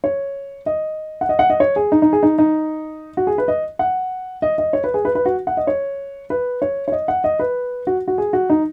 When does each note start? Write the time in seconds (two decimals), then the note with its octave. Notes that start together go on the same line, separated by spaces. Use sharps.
0.04 C#5
0.66 D#5
1.21 F#5
1.29 D#5
1.39 F#5
1.50 D#5
1.60 C#5
1.76 G#4
1.92 D#4
2.02 D#4
2.13 G#4
2.23 D#4
2.39 D#4
3.17 F#4
3.27 G#4
3.38 B4
3.48 D#5
3.79 F#5
4.42 D#5
4.58 D#5
4.73 C#5
4.84 B4
4.94 G#4
5.05 B4
5.15 B4
5.26 F#4
5.47 F#5
5.57 D#5
5.67 C#5
6.30 B4
6.62 C#5
6.88 C#5
6.92 D#5
7.08 F#5
7.24 D#5
7.39 B4
7.87 F#4
8.08 F#4
8.18 G#4
8.33 F#4
8.50 D#4